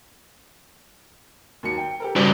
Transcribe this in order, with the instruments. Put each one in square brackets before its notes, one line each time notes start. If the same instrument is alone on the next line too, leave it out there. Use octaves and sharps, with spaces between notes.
[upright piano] D#2 F#3 C#7
G5
G4 A4 A#4
[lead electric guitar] G2 C#3 [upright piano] F#4 B4 D5